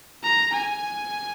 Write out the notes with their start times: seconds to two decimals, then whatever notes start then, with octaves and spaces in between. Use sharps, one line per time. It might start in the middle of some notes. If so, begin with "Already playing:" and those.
0.23 A#5
0.53 G#5